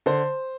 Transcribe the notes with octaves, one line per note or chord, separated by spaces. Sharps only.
D3 C5